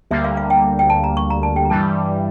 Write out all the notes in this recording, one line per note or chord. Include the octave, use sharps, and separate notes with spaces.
D2 D3 G3 A#3 E5
F5
F5
G5
G5
A5
A#5
C#6
A#5
A5
G5
A#5
G2 E3 G3 A5